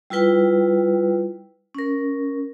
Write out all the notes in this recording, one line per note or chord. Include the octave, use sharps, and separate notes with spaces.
G3 E4 F4 B4 G5
C#4 A#4